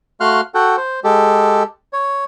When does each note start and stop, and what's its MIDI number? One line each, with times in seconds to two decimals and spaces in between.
0.20 0.41 57
0.20 0.41 66
0.20 0.41 77
0.20 0.41 84
0.20 0.41 89
0.20 0.41 90
0.54 0.76 66
0.54 0.76 69
0.54 0.76 78
0.54 0.76 79
0.77 1.00 72
1.04 1.63 56
1.04 1.63 67
1.04 1.63 69
1.93 2.24 73